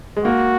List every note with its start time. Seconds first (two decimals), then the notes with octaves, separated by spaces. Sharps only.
0.17 G#3
0.25 A#3 F#4